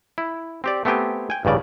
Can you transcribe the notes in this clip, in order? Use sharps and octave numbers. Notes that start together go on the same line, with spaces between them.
E4
C4 G4 D5
A3 B3 C4 G4 G5 G#5
G5 G#5
A1 G2 C#3 D5